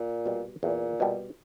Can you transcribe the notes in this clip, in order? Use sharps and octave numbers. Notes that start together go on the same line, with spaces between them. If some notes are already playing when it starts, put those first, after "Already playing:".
Already playing: A#2
B2 G3
E2 A#2
B2 G3